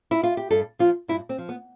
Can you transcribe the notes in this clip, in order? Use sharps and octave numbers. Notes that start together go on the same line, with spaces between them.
E4
F4
G4
G2 A4
F3 F4
G2 E4
C4
F3
B3